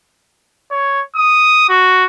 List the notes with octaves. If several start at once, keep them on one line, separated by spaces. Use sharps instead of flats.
C#5
D#6
F#4